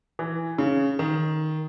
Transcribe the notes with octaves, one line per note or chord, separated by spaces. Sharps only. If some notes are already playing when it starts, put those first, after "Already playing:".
E3
C#3
D#3